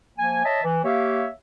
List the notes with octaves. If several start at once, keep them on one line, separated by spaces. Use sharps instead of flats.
F3 A#3 G#5
C#5 D#5 E5 A5
E3
A#3 G4 C#5 E5 F5